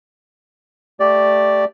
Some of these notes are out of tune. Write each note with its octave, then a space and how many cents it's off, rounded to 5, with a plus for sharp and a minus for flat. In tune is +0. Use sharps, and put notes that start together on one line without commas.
A3 +0 G4 +0 D5 +0